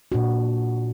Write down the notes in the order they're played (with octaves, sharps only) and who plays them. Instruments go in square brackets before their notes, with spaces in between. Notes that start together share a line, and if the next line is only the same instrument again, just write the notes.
[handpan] A#2 D4 F#4